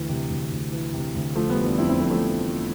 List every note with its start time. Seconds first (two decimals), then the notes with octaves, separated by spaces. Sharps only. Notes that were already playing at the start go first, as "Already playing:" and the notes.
Already playing: D2 E3
0.09 C3
0.30 D2
0.52 D2
0.72 E3
0.94 C3
1.15 D2
1.36 F1 F3 A3
1.50 G3 B3
1.58 E3
1.64 B3 D4
1.78 F2 C4 E4
1.89 C4 E4
1.99 F1 A3 C4
2.10 F3 A3
2.21 F1
2.42 E3